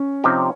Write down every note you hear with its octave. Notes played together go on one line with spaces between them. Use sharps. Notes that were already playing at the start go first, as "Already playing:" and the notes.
Already playing: C#4
C3 F3 C4 D#4 G4